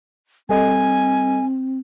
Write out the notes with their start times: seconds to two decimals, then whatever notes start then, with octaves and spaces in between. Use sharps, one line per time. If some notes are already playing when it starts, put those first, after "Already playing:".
0.49 G3 C4 A4 D#5 G#5